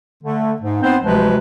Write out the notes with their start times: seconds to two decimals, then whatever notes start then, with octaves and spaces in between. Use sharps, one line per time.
0.23 D3 A3
0.61 G#2
0.82 B3 C4 D#4 C5
1.02 D2 C3 F3 F#3 G#3 B4